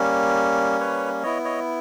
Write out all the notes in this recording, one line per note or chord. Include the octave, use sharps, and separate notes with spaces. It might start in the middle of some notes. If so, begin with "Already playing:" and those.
Already playing: G3 A#3 C#4
B4 C#5
B3 E4 C#5 D#5
C#5 D#5